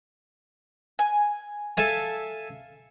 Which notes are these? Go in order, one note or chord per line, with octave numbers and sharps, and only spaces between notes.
G#5
A4 E5 F5 G#5